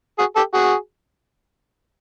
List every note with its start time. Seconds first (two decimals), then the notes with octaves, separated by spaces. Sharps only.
0.19 F#4 G#4
0.36 G4 A4
0.53 F#4 G#4